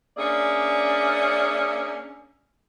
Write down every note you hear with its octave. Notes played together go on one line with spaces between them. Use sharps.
A#3 C#4 D4 G#4 D5 E5